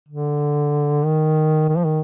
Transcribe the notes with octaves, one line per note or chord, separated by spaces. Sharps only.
D3
D#3
D#3
F3
D#3